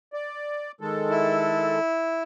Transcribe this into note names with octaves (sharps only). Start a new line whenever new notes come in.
D5
D#3 G#3 A4
E4